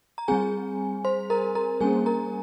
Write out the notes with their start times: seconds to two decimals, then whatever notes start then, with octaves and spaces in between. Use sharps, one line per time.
0.18 A#5
0.28 G3 C4 G#4 G#5
1.05 C5 C6
1.30 A#4 A#5
1.55 A#4 A#5
1.80 G3 A#3 C#4 G#4 G#5
2.06 A#4 A#5